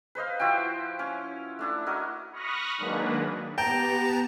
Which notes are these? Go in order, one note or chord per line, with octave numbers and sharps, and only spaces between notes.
B4 C5 D#5 F5
F3 E4 F#4 G5
C#4
A3 D4 E4
E4 F#4 A#4 D#5
B5 C#6 D#6 F6 F#6 A#6
D#3 F#3 G#3 A#3 D4 B4
B3 G4 G5 A5 A#5